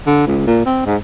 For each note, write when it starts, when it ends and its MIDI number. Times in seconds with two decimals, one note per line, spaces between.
0.06 0.25 50
0.27 0.43 37
0.47 0.62 46
0.66 0.82 60
0.86 0.96 44